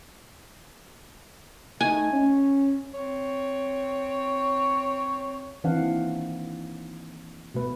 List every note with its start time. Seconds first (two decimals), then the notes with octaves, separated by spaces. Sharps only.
1.81 A3 D#4 G#5
2.12 C#4
2.94 C4 C#5
5.64 D#3 E3 C4 D4 F5 F#5
5.80 A#3
7.54 B2 A3 B4